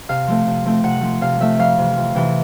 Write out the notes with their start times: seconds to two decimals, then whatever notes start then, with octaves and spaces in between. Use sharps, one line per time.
0.09 C3 F5
0.27 F3 A3 C4
0.46 C3
0.66 F3 A3 C4
0.83 C3 F#5
1.01 F3 A3 C4
1.21 C3 F5
1.40 F3 A3 C4 E5
1.59 F2 F5
1.78 C3 E3
1.97 F2
2.15 C3 E3